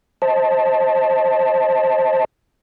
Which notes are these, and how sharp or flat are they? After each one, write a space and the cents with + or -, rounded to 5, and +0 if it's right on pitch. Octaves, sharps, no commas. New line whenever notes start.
C5 +15 D#5 +20 A5 +0